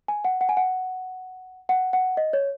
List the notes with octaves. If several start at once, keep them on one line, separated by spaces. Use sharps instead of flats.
G#5
F#5
F#5
G#5
F#5
F#5
F#5
D#5
C#5